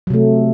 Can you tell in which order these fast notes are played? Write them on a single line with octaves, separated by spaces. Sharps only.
F#3 C3 A3